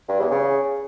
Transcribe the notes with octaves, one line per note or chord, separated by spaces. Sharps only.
G2
E2
C#3